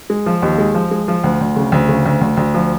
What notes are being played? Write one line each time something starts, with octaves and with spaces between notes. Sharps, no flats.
G#3
F3
D#2
G#3
F3
G#3
F3
D2
D2
C#3
D2
C#3
D2
D2
D2
F3